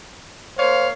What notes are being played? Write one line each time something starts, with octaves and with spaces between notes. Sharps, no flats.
A#3 C5 C#5 F5